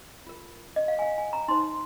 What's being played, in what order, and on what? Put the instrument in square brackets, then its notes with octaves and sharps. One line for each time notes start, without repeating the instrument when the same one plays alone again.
[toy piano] F4 A#4
D#5
F5
G#5
F5
G#5
A#5
D#4 C5 C6